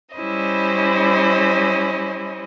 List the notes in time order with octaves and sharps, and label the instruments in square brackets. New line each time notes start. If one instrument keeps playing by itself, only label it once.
[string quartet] G3 C#4 E4 C5 D#5